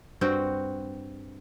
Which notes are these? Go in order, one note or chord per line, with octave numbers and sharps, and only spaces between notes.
G2 C4 F#4 G5